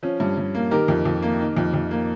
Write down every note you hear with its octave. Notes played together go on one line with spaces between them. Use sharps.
F3 C#4
G2
G2
A#3
D#3 G4 A#4
F2
F2
A#3
D#3
F2
F2
A#3